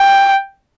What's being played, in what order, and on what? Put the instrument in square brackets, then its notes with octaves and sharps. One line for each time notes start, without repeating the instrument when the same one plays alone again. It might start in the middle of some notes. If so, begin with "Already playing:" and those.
Already playing: [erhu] G5